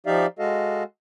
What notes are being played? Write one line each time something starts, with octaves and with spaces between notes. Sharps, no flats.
F3 D#4 G4 D5 E5 F5
G#3 F#4 A4 D#5 F5